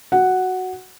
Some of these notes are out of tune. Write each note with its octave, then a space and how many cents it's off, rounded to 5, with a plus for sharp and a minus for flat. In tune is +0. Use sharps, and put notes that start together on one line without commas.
F#4 +0 F#5 +0